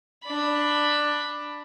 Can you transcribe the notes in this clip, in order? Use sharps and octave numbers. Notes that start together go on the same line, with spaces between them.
D4 B5